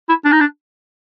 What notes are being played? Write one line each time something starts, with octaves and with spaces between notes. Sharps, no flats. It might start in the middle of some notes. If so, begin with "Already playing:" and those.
E4
D4
D#4
D4